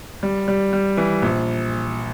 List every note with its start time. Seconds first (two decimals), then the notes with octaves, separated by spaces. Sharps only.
0.23 G3
0.48 G3
0.73 G3
0.97 E3
1.22 A#1